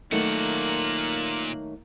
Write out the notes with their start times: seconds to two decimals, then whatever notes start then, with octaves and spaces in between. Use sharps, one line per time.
0.12 A#2 D#3 F#3 A3 A#3 F#5 F#6